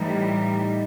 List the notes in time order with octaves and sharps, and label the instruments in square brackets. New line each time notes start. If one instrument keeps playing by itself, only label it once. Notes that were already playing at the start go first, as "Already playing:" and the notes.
Already playing: [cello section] A2 E3 G3 [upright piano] D#4